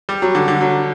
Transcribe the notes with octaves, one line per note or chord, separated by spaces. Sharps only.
G3
F#3
D3
D3
F#3